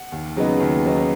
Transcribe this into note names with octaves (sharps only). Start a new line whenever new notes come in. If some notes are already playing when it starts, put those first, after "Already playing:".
Already playing: F#5
D#2
C#3 F#3 B3 D#4
D#2
C#3 F#3 B3 D#4